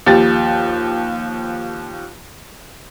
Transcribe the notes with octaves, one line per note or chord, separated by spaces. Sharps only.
D#2 F3 G4 A6